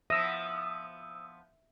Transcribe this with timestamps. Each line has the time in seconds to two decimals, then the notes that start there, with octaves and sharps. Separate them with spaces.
0.10 F3 B3 E5 D#6 E6 A#6